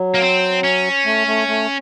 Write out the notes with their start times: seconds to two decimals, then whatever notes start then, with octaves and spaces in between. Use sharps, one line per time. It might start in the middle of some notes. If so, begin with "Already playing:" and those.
Already playing: F#3
0.15 A#3
0.22 C4
0.64 C#4
1.05 A3
1.27 A3
1.48 A3